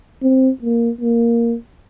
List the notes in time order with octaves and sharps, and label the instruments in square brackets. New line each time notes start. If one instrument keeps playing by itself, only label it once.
[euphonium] C4
A#3
A#3